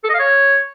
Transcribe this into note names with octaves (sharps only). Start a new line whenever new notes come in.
A4
D#5
F5
C#5